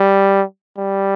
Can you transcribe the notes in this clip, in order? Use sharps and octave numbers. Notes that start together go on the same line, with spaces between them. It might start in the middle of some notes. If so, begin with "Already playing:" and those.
Already playing: G3
G3